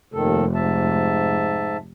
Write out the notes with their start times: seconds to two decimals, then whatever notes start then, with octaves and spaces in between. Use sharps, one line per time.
0.14 F1 D#2 D#3 A4
0.55 G#2 E5 A5